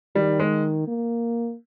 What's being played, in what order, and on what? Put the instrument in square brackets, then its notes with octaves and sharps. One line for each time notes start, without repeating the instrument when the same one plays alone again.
[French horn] D#3 [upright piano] G3
[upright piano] G#3
[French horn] A#3